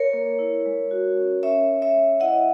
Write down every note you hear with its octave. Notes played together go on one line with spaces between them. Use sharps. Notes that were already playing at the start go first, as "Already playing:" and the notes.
Already playing: A#4 C#5
A#3
E4
G#3
F#4
C#4
C#4 C#5 E5
C#4
C#5 E5
G#3
E4 D#5 F#5